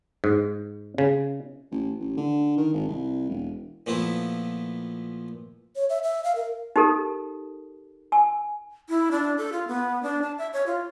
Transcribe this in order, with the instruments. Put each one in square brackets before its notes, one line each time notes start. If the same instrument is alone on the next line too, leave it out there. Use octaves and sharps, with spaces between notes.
[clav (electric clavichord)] G#2
C#3
[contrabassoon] A1
A1
D3
D#3
G#1
C2
E1
[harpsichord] A#2 F3 A3 B3 E4
[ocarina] C#5
E5
E5
F5
A#4
[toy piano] D#4 G4 A4 A#4
G#5
[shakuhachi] E4
D4
A4
F4
B3
D4
A5
E5
C#5
F4